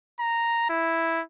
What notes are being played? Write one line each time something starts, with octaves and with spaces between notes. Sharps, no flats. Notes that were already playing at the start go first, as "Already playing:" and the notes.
A#5
E4